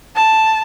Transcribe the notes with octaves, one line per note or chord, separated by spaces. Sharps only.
A5